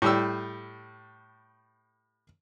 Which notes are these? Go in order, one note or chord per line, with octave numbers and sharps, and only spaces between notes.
A2 G3 E6